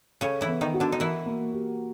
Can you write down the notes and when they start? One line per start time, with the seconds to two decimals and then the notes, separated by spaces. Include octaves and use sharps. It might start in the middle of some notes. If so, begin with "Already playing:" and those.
0.21 C#3 C#4 A4
0.41 E3 E4
0.48 B3
0.61 D#3 D#4
0.74 F#4
0.80 D3 D4
0.92 D#4
1.00 E3 E4 A#4
1.26 A#3
1.52 G4